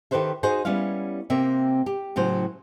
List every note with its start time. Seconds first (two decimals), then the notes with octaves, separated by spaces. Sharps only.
0.11 D#3 G4 A4 B4 C5 E5
0.43 D#4 F#4 G#4 C5
0.65 G3 B3 C#4 E4 F5
1.30 C3 A#3 C4 E5
1.86 G4
2.16 A2 C#3 F#3 C5